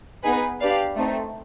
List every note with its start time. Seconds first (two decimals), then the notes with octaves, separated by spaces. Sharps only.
0.23 B3 D#4 G#4 B4
0.60 D4 G4 B4 D5 F5
0.97 A3 C4 D#4